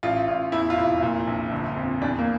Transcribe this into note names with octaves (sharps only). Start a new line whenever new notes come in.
A1 F4
A1 F4
E2 E4
F4
F1 E4
A#2
A#1
G1
F2
E2 D4
A#3